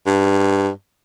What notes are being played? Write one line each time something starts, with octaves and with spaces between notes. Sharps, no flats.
G2